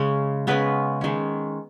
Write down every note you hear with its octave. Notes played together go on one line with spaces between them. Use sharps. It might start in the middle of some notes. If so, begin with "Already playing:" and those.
Already playing: C#3 G#3 C#4
C#3 G#3 B3 C#4 B4
D#3 G#3 C#4